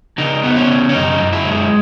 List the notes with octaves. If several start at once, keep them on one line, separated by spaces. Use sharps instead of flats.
C#3 D#4
B3
C#4
C#3
C#4
F#2 D#4
F#2
E4
G#3